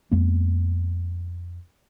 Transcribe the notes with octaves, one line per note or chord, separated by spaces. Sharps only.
F2 G#3 A#3 B3